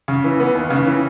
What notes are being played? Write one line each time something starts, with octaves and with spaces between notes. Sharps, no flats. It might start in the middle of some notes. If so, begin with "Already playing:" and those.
C#3
E3
B3
D#2
C#3
E3